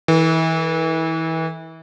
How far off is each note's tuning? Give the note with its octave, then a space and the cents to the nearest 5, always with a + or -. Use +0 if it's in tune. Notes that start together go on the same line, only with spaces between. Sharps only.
E3 -30 A4 +15